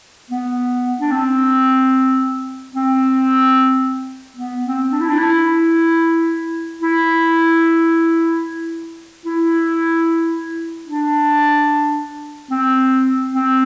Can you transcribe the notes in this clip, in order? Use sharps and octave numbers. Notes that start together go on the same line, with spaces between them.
B3
D4
C4
C4
B3
C4
D4
E4
D4
E4
E4
E4
D4
C4
C4